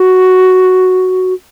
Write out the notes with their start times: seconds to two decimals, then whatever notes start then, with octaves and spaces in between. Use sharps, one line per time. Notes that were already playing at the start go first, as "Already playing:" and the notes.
Already playing: F#4